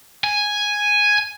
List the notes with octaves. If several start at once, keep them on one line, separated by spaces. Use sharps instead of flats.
G#5